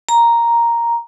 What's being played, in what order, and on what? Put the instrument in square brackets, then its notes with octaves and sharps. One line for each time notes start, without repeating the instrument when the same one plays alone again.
[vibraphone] A#5